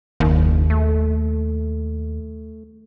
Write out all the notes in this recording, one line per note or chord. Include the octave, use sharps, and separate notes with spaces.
F#1 D#2
A3